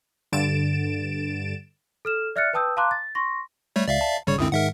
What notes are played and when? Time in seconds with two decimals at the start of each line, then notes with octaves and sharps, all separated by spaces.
0.32 G2 D3 A6 D7 E7
2.05 A4 F6 E7
2.36 D5 E5 F6 F#6 A6 C#7
2.53 B4 G5 A5 D#6 E6 G6
2.77 F5 A5 A#5 C6 D6 F#6
2.91 A6
3.15 C6 C#6 A#6
3.76 G3 A3 C#5
3.88 C#2 D5 E5 F5
4.01 A5
4.27 G1 C#3 G3 C#5 C#6
4.38 C#2 F#2 D3 C4 E4 D#6
4.52 G#2 D#3 G#3 A#4 E5 F#5